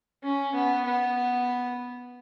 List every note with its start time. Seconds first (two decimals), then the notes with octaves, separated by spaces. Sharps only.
0.24 C#4
0.55 B3
0.86 B3